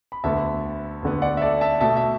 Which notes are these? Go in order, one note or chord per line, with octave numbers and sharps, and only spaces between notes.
B5
D2 D3 B3 E5 A5
D2 D3 B3
D5 F#5
E5
A4 D5
E5 A5
B2 A3 E5 A5
E5